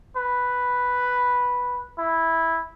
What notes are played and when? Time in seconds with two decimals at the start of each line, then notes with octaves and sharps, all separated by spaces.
0.16 B4
1.98 E4